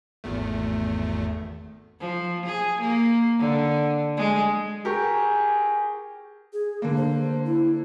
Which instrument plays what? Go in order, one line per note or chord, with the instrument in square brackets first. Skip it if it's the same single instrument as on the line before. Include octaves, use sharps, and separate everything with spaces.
[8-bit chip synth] G#1 E2 A3
[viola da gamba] F3
G#4
A#3
D3
G#3
[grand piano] G4 A#4 C#6 [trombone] G#4
[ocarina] G#4
[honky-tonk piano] D3 A#3
[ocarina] C5
E4